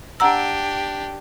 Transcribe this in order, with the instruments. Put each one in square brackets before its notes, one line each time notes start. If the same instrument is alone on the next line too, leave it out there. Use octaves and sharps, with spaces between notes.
[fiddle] D4 G4 [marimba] F#5 A#5 E6